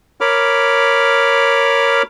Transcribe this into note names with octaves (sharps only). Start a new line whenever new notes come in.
A#4 C#5 B5 D6 F6